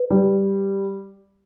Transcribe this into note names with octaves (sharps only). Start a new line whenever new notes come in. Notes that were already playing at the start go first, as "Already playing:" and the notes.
Already playing: B4
G3